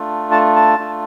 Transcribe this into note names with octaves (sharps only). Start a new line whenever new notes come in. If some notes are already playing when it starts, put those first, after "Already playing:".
Already playing: A3 D4 F4
A5
A5
A3 D4 F4